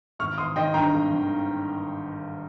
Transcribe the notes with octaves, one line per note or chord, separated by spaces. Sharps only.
G#1 C#6 F6
G#1 C6 D#6
D#3 D#5 G5
G2 G5 A#5
G#1
D#3